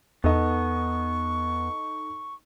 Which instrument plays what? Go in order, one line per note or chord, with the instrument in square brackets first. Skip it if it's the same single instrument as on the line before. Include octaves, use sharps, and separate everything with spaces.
[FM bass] E2 [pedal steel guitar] B3 [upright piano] D#4 A4 D#5 [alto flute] C#6